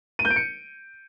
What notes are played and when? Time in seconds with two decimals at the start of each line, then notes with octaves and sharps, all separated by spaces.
0.19 D#7
0.25 G6
0.30 D7
0.36 C#7